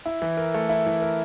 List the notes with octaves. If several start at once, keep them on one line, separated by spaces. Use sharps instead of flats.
E4
E3
A#4
A3
E4
E3
A#4